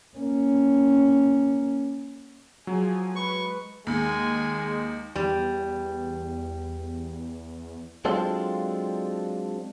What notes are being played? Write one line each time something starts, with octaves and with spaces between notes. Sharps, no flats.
A#3 C#4
F3 F#3 G#4 G#5
G#3 B4 C#6
D#2 G#3 G#5
E2 G3
F#3 G#3 C4 D4 F4 A4